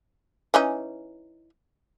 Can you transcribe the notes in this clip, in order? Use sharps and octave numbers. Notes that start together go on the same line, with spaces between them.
E3 C#4 D#4